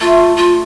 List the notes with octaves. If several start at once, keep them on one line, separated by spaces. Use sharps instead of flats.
A3 F4
F4